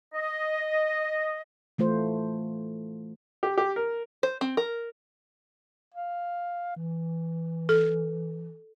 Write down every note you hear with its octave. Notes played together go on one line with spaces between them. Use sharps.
D#5
E3 A3 F4 C5
G4
G4
A#4
C5
C4
A#4
F5
E3
A4